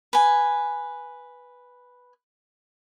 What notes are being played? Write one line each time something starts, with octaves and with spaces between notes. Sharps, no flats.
B4 G#5